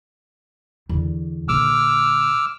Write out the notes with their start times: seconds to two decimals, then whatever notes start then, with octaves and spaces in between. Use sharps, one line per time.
0.89 E2 D3
1.49 A#1 D3 D6 E6 F6